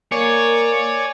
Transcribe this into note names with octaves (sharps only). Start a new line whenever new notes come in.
A#3 C#5 D5 G#5